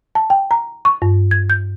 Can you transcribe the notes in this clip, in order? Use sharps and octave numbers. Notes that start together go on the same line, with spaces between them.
A5
G5
A#5
C#6
G2
G#6
G6